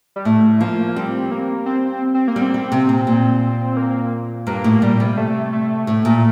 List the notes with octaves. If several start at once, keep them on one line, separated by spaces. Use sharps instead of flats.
G3
A2 A3
F3 A#3
A#3
G3 C4
A#3
C4
C4
A#3
G3
C4
G3
C3
A#2
A#2
A#3
G2 A#3
A2
A#2 G3
C3
A3
A3
A2
A#2